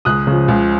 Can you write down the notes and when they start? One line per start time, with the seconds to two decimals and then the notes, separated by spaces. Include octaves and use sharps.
0.05 C#2 D#6 F#6
0.27 C#3 F3
0.48 C#2